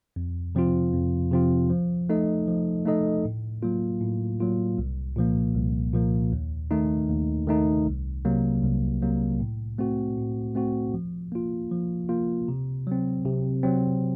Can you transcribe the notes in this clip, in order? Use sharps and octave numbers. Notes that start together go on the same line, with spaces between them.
F2
C3 F3 C4 F4
F2
C3 F3 C4 F4
F3
A3 D#4 A4 D#5
F3
A3 D#4 A4 D#5
A2
F#3 A#3 F4
A2
F#3 A#3 F4
C2
A#2 F3 A#3
C2
A#2 F3 A#3
D#2
D#3 A3 D#4
D#2
D#3 A3 D#4
C2
C3 F#3 A#3
C2
C3 F#3 A#3
A2
A3 C4 F#4
A2
A3 C4 F#4
F3
A#3 F4
F3
A#3 F4
C3
F#3 C4
C3
F#3 C4